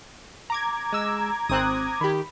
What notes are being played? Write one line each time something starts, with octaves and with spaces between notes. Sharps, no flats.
A#5 D6 G#6
G#3 E6
G#1 C4 D#6 F#6
D#3 G4 B5